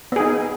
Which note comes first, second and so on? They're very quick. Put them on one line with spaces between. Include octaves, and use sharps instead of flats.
B3 G#4 D#4